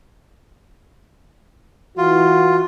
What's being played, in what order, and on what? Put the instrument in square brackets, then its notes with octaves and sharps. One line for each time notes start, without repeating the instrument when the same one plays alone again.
[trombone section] E3 F#4 [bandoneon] F4